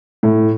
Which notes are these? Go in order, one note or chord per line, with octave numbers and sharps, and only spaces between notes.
A2